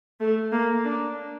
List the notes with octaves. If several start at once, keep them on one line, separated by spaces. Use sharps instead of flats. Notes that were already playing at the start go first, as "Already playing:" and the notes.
A3
A#3
D4